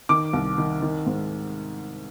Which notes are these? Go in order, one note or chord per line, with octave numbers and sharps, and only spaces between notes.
D#3 D6
C2
D#3
D#3
G#2